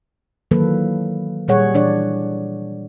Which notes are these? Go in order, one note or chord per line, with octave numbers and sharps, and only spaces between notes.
D#3 E3 F#3 A#3 A4 B4
A#2 G3 G#4 C#5 F#5
A#2 E3 D4 C#5 D5